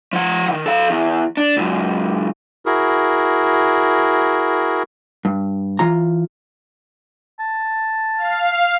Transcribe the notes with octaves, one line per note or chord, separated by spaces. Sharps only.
F3 F#5
D#3 E3
A4 F5
E2
D4
C#2 F#2
E4 F#4 G#4 A#4
G2
E3 F4 A#5
A5
F5